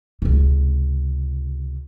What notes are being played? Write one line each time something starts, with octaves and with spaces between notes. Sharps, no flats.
C#2 C3